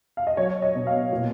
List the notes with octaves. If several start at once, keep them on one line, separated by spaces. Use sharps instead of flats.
F5
D#5
F#3 C#5
D#5
B2
F5
A#2